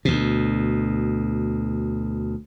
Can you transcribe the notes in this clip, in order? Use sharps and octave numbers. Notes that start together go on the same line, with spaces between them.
D2 B2